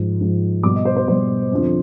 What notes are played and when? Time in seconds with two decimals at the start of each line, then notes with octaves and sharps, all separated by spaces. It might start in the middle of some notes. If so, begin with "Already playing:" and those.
Already playing: G#2 F3
0.21 G#2 F3
0.63 B2 G3 D6
0.75 D#5
0.85 C5
0.96 C5
1.07 B2 G3 C5
1.52 F2 D3 F3